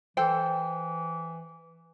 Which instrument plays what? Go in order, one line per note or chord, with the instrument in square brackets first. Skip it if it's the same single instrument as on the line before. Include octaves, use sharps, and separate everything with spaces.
[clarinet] E3 [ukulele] A4 C5 G5